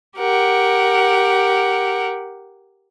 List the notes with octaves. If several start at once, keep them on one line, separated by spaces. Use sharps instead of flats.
G4 A#4 F#5